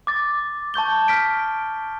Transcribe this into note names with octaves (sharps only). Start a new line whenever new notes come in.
D6 A6
A5 C#6 G6 G7
F6 B6 D7